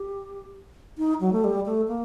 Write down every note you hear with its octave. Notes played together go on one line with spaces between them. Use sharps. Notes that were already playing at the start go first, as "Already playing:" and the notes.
Already playing: G4
D#4
F#3
A3
G3
A3
A#3